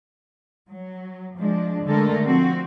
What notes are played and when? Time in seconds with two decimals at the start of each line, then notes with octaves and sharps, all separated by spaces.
0.68 F#3
1.37 F3 G#3 D4
1.84 D3 G#3 A3 A4 A#4
2.25 F3 C4 F#4